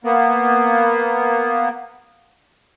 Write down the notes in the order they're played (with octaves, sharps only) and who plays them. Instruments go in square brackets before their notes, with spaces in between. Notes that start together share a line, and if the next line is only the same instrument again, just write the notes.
[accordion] A#3 B3